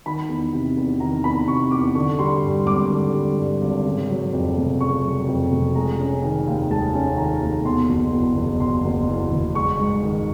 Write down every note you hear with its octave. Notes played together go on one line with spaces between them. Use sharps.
D#3 B5
E2
C3
E2
D#3 A#5
E2 B5
C3 C#6
E2 D6
D3 C#6
G3 C6
G2
G#1 D6
D3
G3
G2
G#1
C#3
F#3
F2
F1
C#3 C#6
F#3
F2
F1
G#3 A#5
C#4
D#3
D#2
G#3 A5
C#4
D#3 A#5
D#2
B2 C6
F#1
E2
F#1
B2 C6
F#1
E2
F#1
G#3 C#6
G#2
D#3